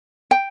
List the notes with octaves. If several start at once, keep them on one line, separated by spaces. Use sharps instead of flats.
G5